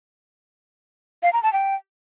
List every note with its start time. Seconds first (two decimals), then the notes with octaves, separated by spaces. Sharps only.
1.23 F5
1.33 A#5
1.43 A5
1.53 G5